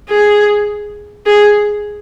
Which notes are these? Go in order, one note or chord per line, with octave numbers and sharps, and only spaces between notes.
G#4
G#4